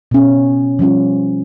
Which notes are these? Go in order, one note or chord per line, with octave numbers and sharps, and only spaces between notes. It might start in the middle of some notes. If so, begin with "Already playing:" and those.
B2 C#4
F3 G3 C#4 F4